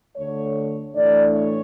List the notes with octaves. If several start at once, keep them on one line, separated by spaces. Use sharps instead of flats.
D2 D3 A3 C#5
A2 E3 A3 D4 D5
C#5